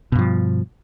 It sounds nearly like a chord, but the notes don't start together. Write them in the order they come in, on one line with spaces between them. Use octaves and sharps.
B2 G2 F3